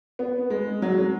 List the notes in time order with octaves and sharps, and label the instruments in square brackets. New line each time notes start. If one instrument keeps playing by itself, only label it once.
[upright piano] B3
G#3
F#3
G#3